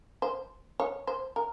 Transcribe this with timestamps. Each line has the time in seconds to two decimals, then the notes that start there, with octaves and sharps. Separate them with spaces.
0.22 C5
0.80 C#5
1.07 C5
1.36 A#4